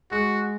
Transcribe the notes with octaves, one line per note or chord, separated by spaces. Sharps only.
G#3 F#4